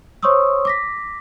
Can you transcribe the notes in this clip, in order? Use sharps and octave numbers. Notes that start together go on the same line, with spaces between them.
C5 C#5 C6 C#6 D#6 E6
D6 A#6 B6